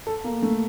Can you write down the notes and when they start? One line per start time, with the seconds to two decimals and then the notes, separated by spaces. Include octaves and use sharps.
0.07 A4
0.24 A#3
0.42 A3